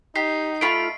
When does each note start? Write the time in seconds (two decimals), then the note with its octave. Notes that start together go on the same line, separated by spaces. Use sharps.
0.16 D#4 G4 C7
0.61 A3 F4 B5 D7